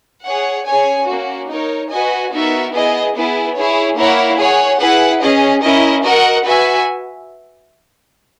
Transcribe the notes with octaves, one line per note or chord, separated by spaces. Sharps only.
G#4 C#5 F#5
C#4 G#4 C#5 G#5
A#3 C#4 F#4
D#4 A#4 C#5
F#4 B4 D#5 G#5
B3 D#4 F#4 A#4 E5
B3 E4 G#4 D#5
B3 E4 G#4 B4
E4 G#4 C#5
A#3 E4 A#4 C#5 F#5
G#4 C#5 F#5
E4 G#4 B4 F#5
C#4 G#4 D#5
C#4 E4 A#4 D#5
F#4 A#4 D#5 F#5
F#4 B4 E5 G#5